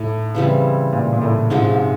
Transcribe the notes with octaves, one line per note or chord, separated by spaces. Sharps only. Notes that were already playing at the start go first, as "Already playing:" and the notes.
Already playing: A2 D#4
C#3 E3 G3 C4
A#2
A#2
A2
G#2 C3 F3 G#3 C#4
G#2